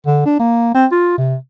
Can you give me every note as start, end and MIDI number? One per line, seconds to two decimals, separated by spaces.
0.06 0.21 50
0.26 0.36 62
0.40 0.71 58
0.74 0.86 60
0.92 1.16 65
1.18 1.36 48